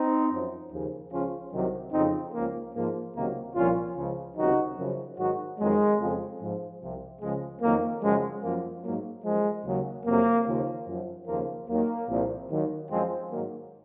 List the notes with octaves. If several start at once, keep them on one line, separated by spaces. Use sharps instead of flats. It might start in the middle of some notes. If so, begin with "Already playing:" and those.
Already playing: C4 D#4
F#2 F3
D#2 C#3 F3
C#2 C#3 F3 C#4 F4
C2 C3 D#3 F#3
F2 C#3 F3 C4 D#4
C#2 C#3 F3 A#3
G#2 F3 A#3
C#2 C3 D#3 F#3 A#3
C2 A#2 F3 C#4 F4
C#2 C#3 F3
C#2 C3 D#3 F#3 D#4 F#4
F#2 C#3 F3
G#2 D#3 F#3 D#4 F#4
F2 D#3 F#3 G#3
F2 C#3 F3
G#2 F3
C2 C3 F3
C#2 C#3 F3 G#3
F2 D#3 F#3 A#3
F#2 C#3 F3 G#3
F#2 F3 A#3
G#2 F#3 A#3
F#2 F3 G#3
D#2 C#3 F#3
F2 C3 F#3 A#3
D#2 C#3 F3
F#2 F3
D#2 C#3 F3 A#3
D#2 D#3 F#3 A#3
C2 A#2 F3
D#2 D#3 F#3
F#2 F3 G#3 C4
G#2 D#3 F#3 A#3